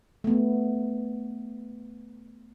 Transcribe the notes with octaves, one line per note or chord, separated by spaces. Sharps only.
A3 B3